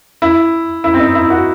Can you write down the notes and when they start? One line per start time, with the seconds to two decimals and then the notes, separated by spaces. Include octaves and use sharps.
0.22 E4
0.84 E4
0.94 C4
0.99 D#4
1.15 E4
1.30 F#4